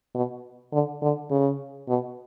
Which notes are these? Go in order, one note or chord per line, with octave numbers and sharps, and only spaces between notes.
B2
D3
D3
C#3
B2